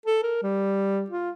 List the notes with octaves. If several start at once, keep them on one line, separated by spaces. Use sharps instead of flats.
A4
A#4
G3
F4